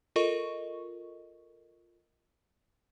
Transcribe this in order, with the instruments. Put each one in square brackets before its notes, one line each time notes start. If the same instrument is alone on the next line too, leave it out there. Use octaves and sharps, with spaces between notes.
[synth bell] F4 A4 A#4 D#5 C#6